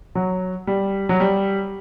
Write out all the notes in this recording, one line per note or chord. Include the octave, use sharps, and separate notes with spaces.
F#3
G3
F#3
G3